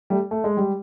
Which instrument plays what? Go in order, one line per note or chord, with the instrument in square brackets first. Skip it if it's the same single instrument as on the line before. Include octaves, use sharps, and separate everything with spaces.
[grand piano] G3 A3
A3
G#3
G3